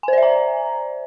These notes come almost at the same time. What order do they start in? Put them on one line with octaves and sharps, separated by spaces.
G#5 C5 D5 E5 A#5